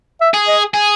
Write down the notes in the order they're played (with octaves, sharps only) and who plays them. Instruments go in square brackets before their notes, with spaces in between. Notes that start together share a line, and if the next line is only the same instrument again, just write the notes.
[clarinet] E5
[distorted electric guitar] G#4
[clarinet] D#5
[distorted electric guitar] G#4